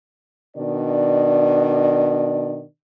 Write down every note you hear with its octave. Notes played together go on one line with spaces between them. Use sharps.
B2 D#3 D4 D5